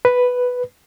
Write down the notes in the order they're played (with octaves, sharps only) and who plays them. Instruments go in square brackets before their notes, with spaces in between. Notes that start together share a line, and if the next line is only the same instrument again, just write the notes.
[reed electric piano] B4